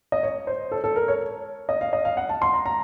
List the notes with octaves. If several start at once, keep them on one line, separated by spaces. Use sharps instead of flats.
D#5
C#5
C5
A4
A4
A#4
C#5
D#5
F5
D#5
F5
F#5
A5
C6
A#5
A#5